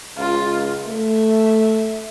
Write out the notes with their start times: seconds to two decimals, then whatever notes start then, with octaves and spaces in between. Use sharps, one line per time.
0.18 C#2 F4
0.87 A3 E5